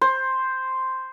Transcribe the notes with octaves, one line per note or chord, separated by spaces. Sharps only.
C5